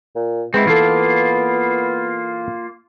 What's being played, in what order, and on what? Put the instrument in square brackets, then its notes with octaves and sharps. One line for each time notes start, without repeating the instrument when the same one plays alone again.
[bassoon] A#2
[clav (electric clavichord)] G#3 [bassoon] B3 [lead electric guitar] C4 E4
[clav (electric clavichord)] E3 A4 [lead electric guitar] A#3 F4